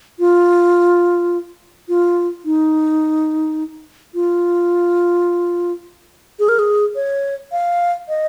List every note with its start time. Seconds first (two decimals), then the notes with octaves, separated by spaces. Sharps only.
0.19 F4
1.89 F4
2.45 D#4
4.15 F4
6.39 G#4
6.49 A#4
6.59 G#4
6.95 C#5
7.52 F5
8.09 D#5